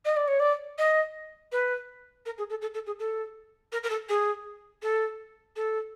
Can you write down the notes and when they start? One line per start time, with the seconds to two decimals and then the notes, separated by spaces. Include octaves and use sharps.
0.05 D#5
0.16 D5
0.27 C#5
0.39 D5
0.78 D#5
1.52 B4
2.25 A#4
2.38 G#4
2.49 A4
2.61 A4
2.74 A4
2.86 G#4
2.99 A4
3.72 A#4
3.83 A#4
3.89 A4
4.09 G#4
4.82 A4
5.56 A4